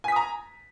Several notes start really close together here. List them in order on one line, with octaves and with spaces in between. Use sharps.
G#5 B6 D#6 A#5